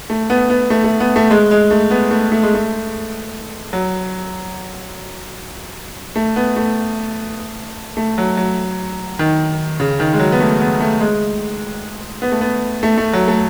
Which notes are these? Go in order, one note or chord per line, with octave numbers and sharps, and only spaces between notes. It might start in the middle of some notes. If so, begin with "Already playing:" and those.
A3
B3
B3
A3
A3
B3
A3
G#3
G#3
A3
B3
A3
A3
G#3
A3
F#3
A3
B3
A3
A3
F#3
F#3
D#3
C#3
D#3
G#3
F#3
B3
A3
B3
A3
G#3
B3
A3
B3
A3
A3
F#3
A3